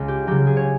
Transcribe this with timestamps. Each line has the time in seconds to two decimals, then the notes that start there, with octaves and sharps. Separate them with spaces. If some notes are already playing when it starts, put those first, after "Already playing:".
Already playing: C#2
0.08 G4
0.27 C#3 F#3 G4
0.47 G#4
0.57 C#5